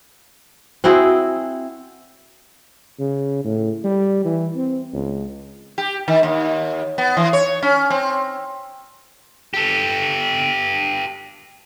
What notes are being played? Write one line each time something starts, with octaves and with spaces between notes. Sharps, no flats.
C4 E4 F#4 G#4
C#3
A2
G3
E3
C4
C#2
G4
D#3
D#2
B3
E3
C#5
C#4
C4
G4 A4